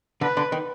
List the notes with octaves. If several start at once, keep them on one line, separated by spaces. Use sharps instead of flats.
D3 B4
D3
D#3